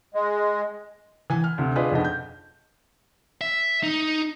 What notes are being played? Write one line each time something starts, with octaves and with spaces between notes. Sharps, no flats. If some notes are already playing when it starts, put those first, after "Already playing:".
G#3
E3 G#5
F6
D2 C3
D4 F4 G#4 B4 D5 D#5
F2 B2 D#4 D#5
G6
E5
D#4